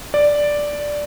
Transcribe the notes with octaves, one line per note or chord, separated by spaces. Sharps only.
D5